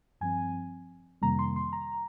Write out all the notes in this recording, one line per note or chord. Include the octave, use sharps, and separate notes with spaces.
G2 F3 C4 G#5
F2 C3 D#3 G3 A#3 A#5
C6
C6
A#5